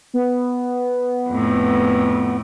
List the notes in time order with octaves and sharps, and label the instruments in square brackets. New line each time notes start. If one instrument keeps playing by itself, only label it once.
[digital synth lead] B3
[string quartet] F2 A2